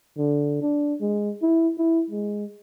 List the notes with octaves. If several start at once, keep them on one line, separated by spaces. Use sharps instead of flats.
D3
D4
G#3
E4
E4
G#3